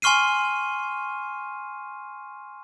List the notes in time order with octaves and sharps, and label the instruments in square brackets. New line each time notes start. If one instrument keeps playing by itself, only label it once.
[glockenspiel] G#5 C6 C#6 F6 C7 D#7